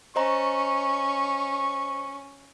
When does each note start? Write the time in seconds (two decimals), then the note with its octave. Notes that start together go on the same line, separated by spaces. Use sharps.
0.16 C#4 C5 D#5 A#5 C#6